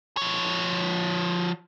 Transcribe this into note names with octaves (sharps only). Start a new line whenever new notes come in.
F3 C#5